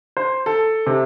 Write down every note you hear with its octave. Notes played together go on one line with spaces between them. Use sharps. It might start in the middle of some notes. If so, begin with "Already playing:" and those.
C5
A4
C3